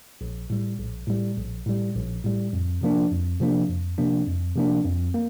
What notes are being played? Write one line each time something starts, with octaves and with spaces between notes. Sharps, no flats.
A#1
A2 G3
A#1
A2 G3
A#1
A2 G3
A#1
A2 G3
F2
C3 F3 A#3 D4
F2
C3 F3 A#3 D4
F2
C3 F3 A#3 D4
F2
C3 F3 A#3 D4
F2
A#3